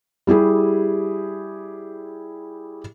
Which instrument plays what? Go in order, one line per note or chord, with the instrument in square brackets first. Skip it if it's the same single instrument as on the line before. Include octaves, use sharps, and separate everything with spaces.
[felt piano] G3 E4 G4 G#4